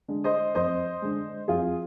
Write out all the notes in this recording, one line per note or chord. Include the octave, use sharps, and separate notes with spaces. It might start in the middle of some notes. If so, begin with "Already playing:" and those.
D3 G#3
C5 D#5
F2 C5 D#5
D3 G#3
F2 F4 G#4